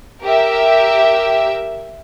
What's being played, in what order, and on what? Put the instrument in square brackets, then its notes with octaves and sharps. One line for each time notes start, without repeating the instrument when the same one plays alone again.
[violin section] G4 A#4 E5